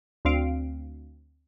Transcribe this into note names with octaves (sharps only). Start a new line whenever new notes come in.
D2 C4 F5 D7